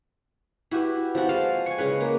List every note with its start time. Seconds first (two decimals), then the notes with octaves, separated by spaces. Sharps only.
0.71 E4 F#4 G4 B4
1.15 F3 G3 C4 F#4
1.29 G#3 F5 A5
1.66 G#5 C#6
1.78 C#3 G#3 C#4 B4
2.01 A#3